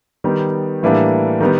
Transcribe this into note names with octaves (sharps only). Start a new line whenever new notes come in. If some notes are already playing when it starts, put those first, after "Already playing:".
D#3 G3 B3
A2 E3 G3 A#3 D4
D#3 G3 B3